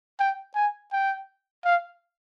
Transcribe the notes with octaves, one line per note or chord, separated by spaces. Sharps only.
G5
G#5
G5
F5